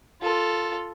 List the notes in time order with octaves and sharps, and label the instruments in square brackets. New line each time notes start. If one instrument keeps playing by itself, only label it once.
[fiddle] F4 A4